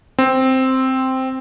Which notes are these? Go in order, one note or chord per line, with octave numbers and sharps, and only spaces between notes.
C4